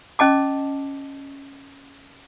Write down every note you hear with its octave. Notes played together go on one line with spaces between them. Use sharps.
C#4 D#5 A5 D6